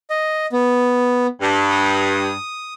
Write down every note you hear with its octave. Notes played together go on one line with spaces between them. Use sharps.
D#5
B3
G2
D#6